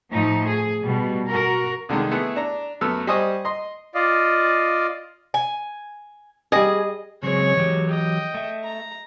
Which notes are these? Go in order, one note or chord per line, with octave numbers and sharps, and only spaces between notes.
A2 F3 A3 D#4
G#4
B2 G3
F#4 A#4
C2 D3 D#3 G#3
A3 B3 E4 G#4
D4 A#5
F#2 A3 B3 E6 F6
G3 C5 D#5 G#5 C#6 D#6
D#5 C6
F4 D5 D#5 F5
G#5
G3 G4 G#4 D#5
C#3 F#3 G#3 C4 C#5
E3 F#3 G4
D#5 G5
A3 E5
A#5